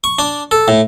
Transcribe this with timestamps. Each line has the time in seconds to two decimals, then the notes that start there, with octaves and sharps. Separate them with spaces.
0.04 C#6
0.19 D4
0.51 A4
0.68 A2